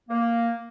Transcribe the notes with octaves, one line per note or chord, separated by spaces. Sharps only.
A#3